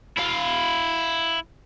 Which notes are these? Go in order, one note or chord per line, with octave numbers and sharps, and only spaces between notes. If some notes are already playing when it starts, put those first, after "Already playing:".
E4 F5